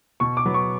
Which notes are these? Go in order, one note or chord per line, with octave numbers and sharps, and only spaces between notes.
B2 C#6
D6
F#3 B3
C#6